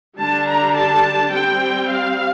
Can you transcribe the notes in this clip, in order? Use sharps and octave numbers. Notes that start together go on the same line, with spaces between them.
D3 G3 D4 A5
A#5
A5
G3 C4 G5
F5